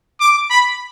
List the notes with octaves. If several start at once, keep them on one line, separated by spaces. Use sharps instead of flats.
D6
B5